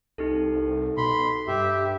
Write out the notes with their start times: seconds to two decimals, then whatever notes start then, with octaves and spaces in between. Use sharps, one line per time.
0.18 C2 D#4 G4 A4
0.97 B2 B5 C6
1.47 G2 G4 E5